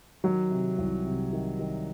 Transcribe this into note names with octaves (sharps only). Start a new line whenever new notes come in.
D#3 F#3
C3
C2
C3
D#3
D#3